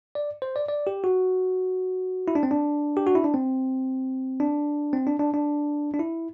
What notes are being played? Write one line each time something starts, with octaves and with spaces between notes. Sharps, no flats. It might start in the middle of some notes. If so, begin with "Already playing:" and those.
D5
C5
D5
D5
G4
F#4
E4
D4
C4
D4
G4
F#4
E4
D4
C4
D4
C4
D4
D4
D4
D4
E4